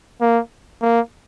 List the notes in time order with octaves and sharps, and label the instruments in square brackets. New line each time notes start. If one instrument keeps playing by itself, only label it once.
[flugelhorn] A#3
A#3